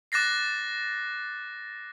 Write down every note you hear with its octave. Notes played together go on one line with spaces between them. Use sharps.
D6 F#6 A6 A#6 C7